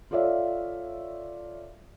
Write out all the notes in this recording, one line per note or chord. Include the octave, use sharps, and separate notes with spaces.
F4 A4 C#5 D5 E5 F5